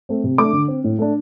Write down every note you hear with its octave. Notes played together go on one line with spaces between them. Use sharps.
A3 C4
C3
A3 D4 D6
D3
C4
A2
A3 D4